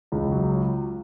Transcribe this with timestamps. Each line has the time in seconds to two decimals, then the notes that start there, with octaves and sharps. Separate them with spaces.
0.12 C#2
0.32 F#3